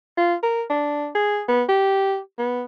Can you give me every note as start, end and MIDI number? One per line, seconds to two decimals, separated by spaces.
0.17 0.35 65
0.43 0.63 70
0.70 1.09 62
1.15 1.42 68
1.48 1.63 59
1.69 2.18 67
2.38 2.63 59